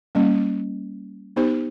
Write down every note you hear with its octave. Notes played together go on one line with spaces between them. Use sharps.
G3 A#3 C#4
B3 D#4 G4 C5